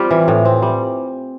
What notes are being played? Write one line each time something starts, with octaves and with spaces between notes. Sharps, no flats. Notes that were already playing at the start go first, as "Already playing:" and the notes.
Already playing: G3 C4 F4 G4
E3
A2
C4
G3